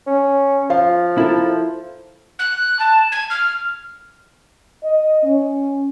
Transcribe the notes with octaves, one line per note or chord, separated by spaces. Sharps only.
C#4
F3 F5
E4 A4 A#4
F#6
A5
G#6
F6
D#5
C#4